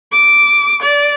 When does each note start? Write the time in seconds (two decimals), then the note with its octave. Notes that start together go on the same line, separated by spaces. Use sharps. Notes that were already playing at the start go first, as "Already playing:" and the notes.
0.12 D6
0.82 D5